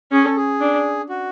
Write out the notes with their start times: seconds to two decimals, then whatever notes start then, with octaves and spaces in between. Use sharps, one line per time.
0.11 C#4 G#4
0.24 A4
0.37 G#4
0.60 D4
1.09 F#4